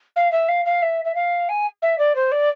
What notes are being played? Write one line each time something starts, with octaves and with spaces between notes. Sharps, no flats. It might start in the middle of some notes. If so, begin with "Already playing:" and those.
F5
E5
F5
F5
E5
E5
F5
G#5
E5
D5
C5
D5